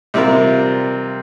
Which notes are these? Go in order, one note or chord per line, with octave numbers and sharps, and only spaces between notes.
C3 G3 C4 F4 A#4